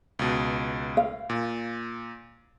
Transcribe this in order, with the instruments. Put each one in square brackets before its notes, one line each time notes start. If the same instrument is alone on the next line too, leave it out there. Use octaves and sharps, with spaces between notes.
[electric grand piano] C#2 B2
[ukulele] F5
[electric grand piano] A#2